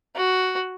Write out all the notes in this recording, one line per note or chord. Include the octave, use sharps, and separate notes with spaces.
F#4